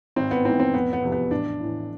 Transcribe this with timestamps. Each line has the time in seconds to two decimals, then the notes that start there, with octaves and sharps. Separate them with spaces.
0.16 G#1 C4
0.31 B3
0.45 G#2 E3 C4
0.60 C4
0.74 F1 B3
0.93 B3
1.02 E2 C3 F3
1.12 B3
1.31 A1 D4
1.60 A2 E3